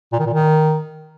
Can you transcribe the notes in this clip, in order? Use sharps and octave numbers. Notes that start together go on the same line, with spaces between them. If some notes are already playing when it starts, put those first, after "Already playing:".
A#2
D#3
A#2
D#3